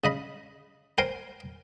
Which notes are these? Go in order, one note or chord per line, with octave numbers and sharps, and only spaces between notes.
C#3 D#5 B5
A#4 C5 G5 G#5 C6